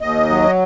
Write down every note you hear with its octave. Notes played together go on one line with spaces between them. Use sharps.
D#2 D#5
F#3